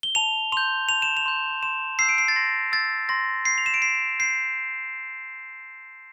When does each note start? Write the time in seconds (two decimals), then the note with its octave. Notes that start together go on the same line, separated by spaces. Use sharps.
0.03 G7
0.15 A5 F7
0.52 C6 G6 F7
0.89 A5 F7
1.02 E7
1.17 F7
1.26 C6 G6
1.63 C6 E7
1.99 E6 G6 C7
2.09 D7
2.18 C7
2.28 A6
2.36 C6 A#6
2.72 E6 G6 A6
3.09 C6 A#6
3.45 G6 C7
3.58 F7
3.66 E7
3.74 D7
3.82 C6 C7
4.19 G6 C7